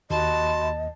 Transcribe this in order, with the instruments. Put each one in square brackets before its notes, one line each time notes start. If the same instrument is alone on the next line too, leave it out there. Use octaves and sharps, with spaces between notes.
[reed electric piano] D#2 [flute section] F#4 B5 C6 [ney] D#5 [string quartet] A5